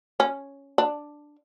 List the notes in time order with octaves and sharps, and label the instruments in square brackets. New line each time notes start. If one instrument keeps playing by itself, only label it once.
[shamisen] C#4
D4